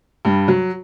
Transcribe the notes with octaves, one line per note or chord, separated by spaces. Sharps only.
G2 G3
F#3